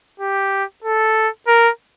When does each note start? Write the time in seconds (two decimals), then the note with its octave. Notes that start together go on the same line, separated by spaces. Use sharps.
0.20 G4
0.84 A4
1.48 A#4